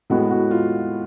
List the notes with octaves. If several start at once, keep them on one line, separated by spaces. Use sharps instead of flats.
A2 G#3 B3 F#4
F#4
F4